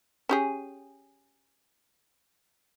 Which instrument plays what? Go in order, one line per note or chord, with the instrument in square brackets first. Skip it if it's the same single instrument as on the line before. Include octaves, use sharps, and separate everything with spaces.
[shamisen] C#4 G4 G#4